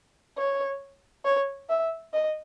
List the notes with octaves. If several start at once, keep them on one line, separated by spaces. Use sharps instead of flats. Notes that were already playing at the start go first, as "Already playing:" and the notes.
C#5
C#5
E5
D#5